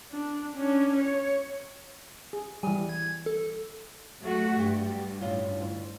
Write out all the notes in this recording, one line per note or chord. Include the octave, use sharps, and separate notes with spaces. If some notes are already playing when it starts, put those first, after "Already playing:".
D4
C#4 D4
C#5
G#4
E3 G3 G#5
G#6
A4
F#3 A3 F#4
G2 F#4 G4
A2 C#3 F4
D2